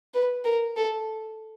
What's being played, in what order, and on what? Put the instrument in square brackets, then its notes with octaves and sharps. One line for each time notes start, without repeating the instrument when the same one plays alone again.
[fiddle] B4
A#4
A4